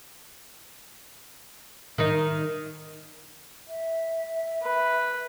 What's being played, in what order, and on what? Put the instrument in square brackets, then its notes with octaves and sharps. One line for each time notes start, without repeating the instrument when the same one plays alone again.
[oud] D#3 D#4
[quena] E5
[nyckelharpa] B4